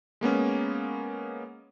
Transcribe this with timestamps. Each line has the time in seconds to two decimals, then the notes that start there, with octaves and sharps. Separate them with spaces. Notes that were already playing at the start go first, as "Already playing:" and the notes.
0.21 G#3 A#3 B3 C#4